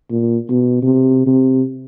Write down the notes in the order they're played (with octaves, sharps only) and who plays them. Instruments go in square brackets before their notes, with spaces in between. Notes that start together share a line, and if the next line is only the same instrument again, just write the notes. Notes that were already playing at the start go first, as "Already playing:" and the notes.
[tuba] A#2
B2
C3
C3